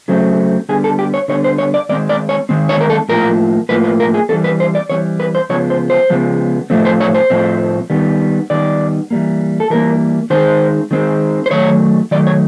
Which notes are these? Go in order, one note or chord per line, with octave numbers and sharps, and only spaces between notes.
C#3 F#3 A3 C4
D3 G3 B3 G#4
A4
G4
C#5
D3 G3 B3 C#5
C5
C#5
D5
D#3 G#3 C4 D5
D5
C#5
D#3 G#3 C4
C#5
A#4
A4
A2 F3 A#3 A#4
A2 F3 A#3 B4
B4
A#4
G#4
E3 G3 C4 A4
B4
C5
D5
E3 G3 C4 C#5
B4
C5
C#3 F3 G#3 B3 C#5
C5
C5
C#3 F3 G#3 B3
A2 F3 A3 C4
C5
C#5
C5
A2 F3 A3 C4
D#3 G3 B3
D#3 G3 B3 D5
E3 G3 A#3
A4
E3 G3 A#3 A#4
D#3 G#3 C4 C5
D#3 G#3 C4
C5
D#3 F#3 A3 C#5
D#3 F#3 A3 D5
C#5